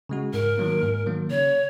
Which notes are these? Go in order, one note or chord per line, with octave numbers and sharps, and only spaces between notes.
C#3 G#3 F#4
G#2 A#4
D#3 F#3 A#3
G#2
D#3 F#3 A#3
C#3 C#5